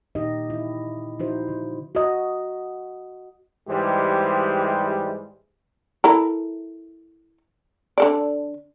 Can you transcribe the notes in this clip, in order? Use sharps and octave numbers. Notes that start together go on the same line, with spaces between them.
A#2 D#4 G4 D#5
E4
F3 D#4 E4 F#4 C5
D3
F#4 D#5
G#2 E3 G3 G#3 G4 C5
E4 A4 A#4
D3 A4 D5